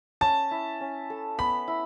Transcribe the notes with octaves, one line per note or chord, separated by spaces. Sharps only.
C#4 A5
E4
C#4
A4
B3 B5
E4